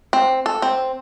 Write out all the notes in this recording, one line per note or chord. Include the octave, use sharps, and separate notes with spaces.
C4
A4
C4